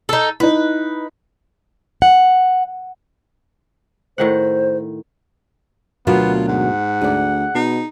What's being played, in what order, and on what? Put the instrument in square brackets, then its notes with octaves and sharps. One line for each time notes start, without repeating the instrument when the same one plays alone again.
[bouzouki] D#4 A4
[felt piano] D#4 E4 [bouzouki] B4
[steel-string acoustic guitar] F#5
[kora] A2 D#3 F#5 [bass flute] C5
[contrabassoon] D2 [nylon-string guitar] B2 F#3 A#3 [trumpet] B3 [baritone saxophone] F4
[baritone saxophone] G#2 [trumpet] F#5
[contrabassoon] D2 [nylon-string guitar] G#4 D5
[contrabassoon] B2 [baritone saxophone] D#4